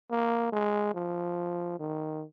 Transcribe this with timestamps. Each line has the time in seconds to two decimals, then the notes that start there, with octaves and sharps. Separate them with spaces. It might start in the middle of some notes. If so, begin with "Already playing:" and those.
0.11 A#3
0.52 G#3
0.94 F3
1.79 D#3